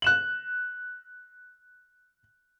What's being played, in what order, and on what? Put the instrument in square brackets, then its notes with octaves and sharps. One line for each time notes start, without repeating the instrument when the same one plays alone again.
[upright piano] F#6 E7 F#7